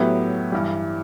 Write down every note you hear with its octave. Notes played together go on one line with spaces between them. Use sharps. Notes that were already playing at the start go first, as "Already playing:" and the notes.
Already playing: A2 F#3 B3 E4 G4
G2 E3 G3